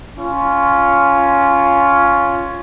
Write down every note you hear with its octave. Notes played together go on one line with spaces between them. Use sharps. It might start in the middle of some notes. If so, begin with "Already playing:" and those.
C#4 F4